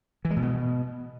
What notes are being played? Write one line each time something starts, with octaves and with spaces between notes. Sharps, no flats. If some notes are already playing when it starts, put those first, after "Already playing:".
E3
G#3
A#2
B2